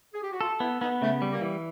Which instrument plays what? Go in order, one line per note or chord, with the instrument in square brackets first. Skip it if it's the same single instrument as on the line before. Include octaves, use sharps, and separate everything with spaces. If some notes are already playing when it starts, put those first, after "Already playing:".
[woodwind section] G#4
G4
F#4
[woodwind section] F4 [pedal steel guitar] A4
[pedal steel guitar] B3 [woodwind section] E4
[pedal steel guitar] B3 [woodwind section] D#4
[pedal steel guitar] C#3 [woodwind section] A3
[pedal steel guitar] G3
[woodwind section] A#3
[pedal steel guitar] E3